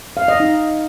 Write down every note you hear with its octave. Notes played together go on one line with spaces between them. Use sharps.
F5
D#5
D#4